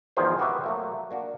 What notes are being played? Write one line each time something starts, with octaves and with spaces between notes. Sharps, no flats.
G#1 E2 D#3 F3 G#4 C5
B3 F#4 G4 A#4 B4 E5
F#3 A3 A#3
A#3 D4 F#4